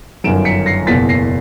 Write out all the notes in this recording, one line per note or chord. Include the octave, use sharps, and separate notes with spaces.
G1 F#2 D#3 F#3 D7 E7
B6 C#7
A#6 C7
F#1 E2 B2 A6 B6
A#6 C7